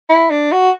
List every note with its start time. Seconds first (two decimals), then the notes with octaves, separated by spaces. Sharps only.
0.09 E4
0.31 D4
0.52 F#4